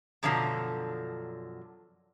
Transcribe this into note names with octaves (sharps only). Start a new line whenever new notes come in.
F#2 B2 D3 F3 F#3